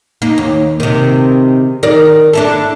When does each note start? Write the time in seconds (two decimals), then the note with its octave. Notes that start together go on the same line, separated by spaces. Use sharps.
0.22 A#3 D#4
0.38 D#2
0.80 C3 D#3
1.83 D#3 A#4 D5
2.33 D4 E4 A4